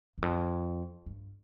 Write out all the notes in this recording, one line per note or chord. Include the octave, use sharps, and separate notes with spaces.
E2
F2
G2